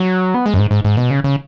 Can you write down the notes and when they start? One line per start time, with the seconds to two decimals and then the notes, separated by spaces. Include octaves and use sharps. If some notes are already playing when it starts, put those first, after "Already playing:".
Already playing: F#3
0.34 B3
0.46 G#3
0.54 F#2
0.59 G#2
0.71 G#2
0.85 G#2
0.97 B2
1.10 C#3
1.24 C#3